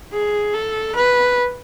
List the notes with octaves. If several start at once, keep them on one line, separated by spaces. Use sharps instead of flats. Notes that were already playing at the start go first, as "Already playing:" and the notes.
G#4
A4
B4